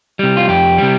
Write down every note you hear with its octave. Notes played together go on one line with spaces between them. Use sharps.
C3 G3
F4
F2 G4
C3 G3